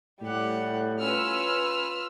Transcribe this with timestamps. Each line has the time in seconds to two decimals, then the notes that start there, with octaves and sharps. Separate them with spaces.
0.22 A2 G3 G4 F#5
1.00 C#4 F4 B4 E6 F6